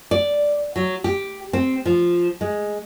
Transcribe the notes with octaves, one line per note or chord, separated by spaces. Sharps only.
D5
F#3
G4
C4
F3
G#3